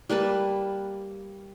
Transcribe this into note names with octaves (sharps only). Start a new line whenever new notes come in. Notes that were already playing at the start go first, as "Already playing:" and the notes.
G3 A#3 B4 A5